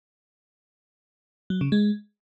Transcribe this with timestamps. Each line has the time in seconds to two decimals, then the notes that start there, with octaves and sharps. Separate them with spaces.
1.50 F#3
1.61 C#3
1.72 G#3